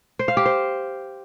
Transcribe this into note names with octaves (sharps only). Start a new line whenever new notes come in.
C5
F5
G4
C5